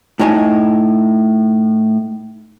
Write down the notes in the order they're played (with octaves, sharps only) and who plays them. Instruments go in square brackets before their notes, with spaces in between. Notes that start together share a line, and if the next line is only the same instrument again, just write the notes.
[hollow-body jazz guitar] A2 D#4 C#5 G#5 A5